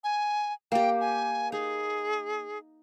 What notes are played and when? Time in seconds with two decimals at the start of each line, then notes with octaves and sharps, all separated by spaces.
0.04 G#5
0.72 A#3 G4 G5
1.01 G#5
1.52 D#4 G#4